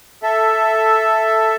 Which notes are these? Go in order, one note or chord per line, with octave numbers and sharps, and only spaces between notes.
A4 E5